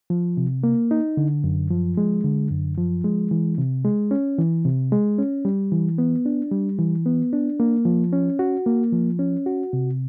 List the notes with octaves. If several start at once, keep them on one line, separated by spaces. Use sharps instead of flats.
F3
C3
A#3
D#4
D3
F#2
F3
G#3
D3
F#2
F3
G#3
E3
C3
G#3
C#4
E3
C3
G#3
C#4
G3
E3
B3
D4
G3
E3
B3
D4
A#3
F3
C#4
F#4
A#3
F3
C#4
F#4
C3